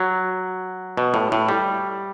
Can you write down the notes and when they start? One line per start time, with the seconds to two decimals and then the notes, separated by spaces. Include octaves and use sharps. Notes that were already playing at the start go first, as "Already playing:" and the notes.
Already playing: F#3
0.97 B2
1.14 A2
1.32 A2
1.49 G3